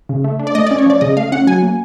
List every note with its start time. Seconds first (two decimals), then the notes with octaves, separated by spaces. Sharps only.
0.09 C#3
0.24 A3
0.39 D4
0.47 D5
0.55 A3 D#5
0.67 D5
0.71 C#4
0.78 C#5
0.86 F3 D5
1.01 C#3 D#5
1.17 A3 F5
1.32 C#4 F#5
1.47 F#3 G#5
1.63 A#3